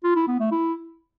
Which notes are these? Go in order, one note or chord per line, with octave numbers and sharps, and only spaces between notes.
F4
E4
B3
A3
E4